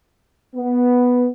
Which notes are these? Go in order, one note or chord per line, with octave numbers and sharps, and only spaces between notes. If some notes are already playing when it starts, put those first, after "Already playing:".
B3